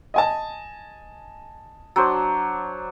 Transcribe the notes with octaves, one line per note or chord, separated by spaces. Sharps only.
D#5 G#5 A5
F#3 D4 C5